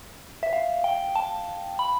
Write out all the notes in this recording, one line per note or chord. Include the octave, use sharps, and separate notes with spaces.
E5
F5
G5
A5
B5